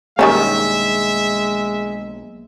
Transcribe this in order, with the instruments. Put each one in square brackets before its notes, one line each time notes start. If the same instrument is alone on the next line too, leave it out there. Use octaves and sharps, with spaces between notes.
[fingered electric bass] B1 A#3 [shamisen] D#3 G3 C#4 [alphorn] G#3 [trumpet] E5